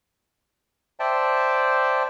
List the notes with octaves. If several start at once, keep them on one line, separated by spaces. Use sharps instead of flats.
C5 D5 E5 G5 A5